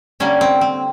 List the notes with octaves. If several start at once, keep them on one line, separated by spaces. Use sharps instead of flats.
D3 G3 A#3 C#4
C4
C4